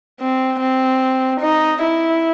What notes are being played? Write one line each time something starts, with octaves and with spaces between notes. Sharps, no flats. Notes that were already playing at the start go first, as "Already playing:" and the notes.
C4
C4
D#4
E4